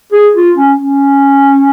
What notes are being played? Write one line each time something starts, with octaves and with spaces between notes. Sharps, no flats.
G#4
F4
C#4
C#4